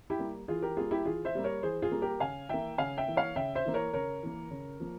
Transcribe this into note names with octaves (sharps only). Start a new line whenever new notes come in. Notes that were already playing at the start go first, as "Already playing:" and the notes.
E4 G4
G3 A#3
E3 F4 G#4
G4 A#4
G3 A#3 F4 G#4
E4 G4
E3 F4 G#4
C5 E5
G3 A#3
A#4 C#5
E3 G#4 C5
F4 G#4
G3 A#3
G4 A#4
C#3 F5 G#5
E3 A#3 E5 G5
C#3 F5 G#5
E5 G5
E3 A#3
C#5 F5
C#3 E5 G5
C5 E5
E3 A#3
A#4 C#5
C#3 A#4 C#5
E3 A#3
C#3
F3 A#3